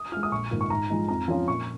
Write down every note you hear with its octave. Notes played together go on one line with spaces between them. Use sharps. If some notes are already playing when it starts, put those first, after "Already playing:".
Already playing: D#6
G#3 F4 F6
D#6
A#1 C#6
G#2 D#3 A#3 F4
C#6
G#2 A#5
F3 G#3 D#4
F2 A#5
F3 C#4 F4
A#2 C#6